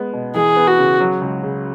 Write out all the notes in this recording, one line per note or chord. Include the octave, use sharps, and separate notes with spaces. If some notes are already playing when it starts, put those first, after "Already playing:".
Already playing: G#3 B3
B2
E3 G#4
B3
F#4
C#3
F#3
C#2
C#3